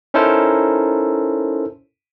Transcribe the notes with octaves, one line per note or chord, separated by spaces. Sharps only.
C#4 D#4 E4 A4 A#4 C5